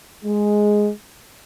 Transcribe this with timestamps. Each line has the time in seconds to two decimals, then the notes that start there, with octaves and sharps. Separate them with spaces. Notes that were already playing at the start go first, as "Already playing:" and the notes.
0.25 G#3